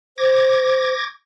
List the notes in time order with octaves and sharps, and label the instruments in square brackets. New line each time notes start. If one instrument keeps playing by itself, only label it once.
[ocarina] C5 [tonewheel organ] D6 G#6 A#6